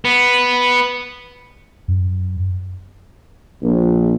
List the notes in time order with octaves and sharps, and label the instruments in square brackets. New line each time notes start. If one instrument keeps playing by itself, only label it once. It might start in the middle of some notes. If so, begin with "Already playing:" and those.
[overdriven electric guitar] B3
[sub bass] F#2
[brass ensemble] A#1